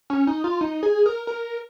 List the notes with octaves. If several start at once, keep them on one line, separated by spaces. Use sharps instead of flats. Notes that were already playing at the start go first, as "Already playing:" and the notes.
C#4
D#4
F4
D#4
G#4
A#4
A#4